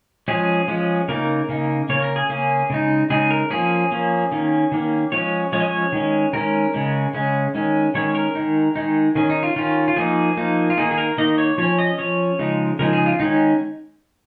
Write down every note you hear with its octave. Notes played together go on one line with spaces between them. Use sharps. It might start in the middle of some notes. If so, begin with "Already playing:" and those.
F3 G#3 C#4 G#4
F3 G#3 C#4
C#3 A#3 D#4 A#4
C#3 A#3 D#4
C#3 A#3 C#4 C#5
A#4
G#4
C#3 A#3 C#4 G#4
C#3 G#3 D#4
C#3 G#3 D#4 G#4
A#4
F3 A#3 C#4 G#4
F3 A#3 C#4
D#3 A#3 C#4
D#3 A#3 C#4
F3 G#3 C#4 C#5
F3 G#3 C#4 C#5
D#5
C#5
D#3 G#3 C#4
D#3 G#3 C#4 A#4
C#3 G#3 C#4
C#3 G#3 C#4
D#3 G#3 C#4
D#3 G#3 C#4 C#5
A#4
D#3 G#3 D#4
D#3 G#3 D#4
D#3 C#4 G#4
D#4
F4
D#3 C#4 F4
F4
F3 A#3 D#4 G#4
F3 A#3 D#4
F4
D#3 A#3 D#4 G#4
G#4
A#4
D#3 A#3 D#4 D#5
C#5
F3 C#4 C#5
D#5
F3 C#4 C#5
C#3 F3 G#3 D#4
C#3 F3 G#3 D#4 A#4
G#4
F4
D#3 G#3 C#4 D#4